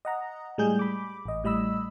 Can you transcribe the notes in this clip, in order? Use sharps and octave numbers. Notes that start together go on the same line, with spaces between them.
D#5 F#5 A#5
A2 G3 G#3 G#4 G6
B5 D6
A1 D#5
A2 G3 D#5 B5 E6